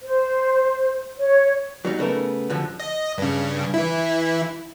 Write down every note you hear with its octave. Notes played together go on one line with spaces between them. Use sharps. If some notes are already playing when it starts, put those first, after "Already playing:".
C5
C#5
F#3 G3 D#4
C#3 A3 B3 A#4
F#2 D3 F3
D#5
G2 C#3
E3 E4